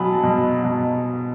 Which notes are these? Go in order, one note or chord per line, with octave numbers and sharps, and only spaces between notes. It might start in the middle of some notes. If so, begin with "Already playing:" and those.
Already playing: B2 F#3 G#5 A5 B5
B2
B2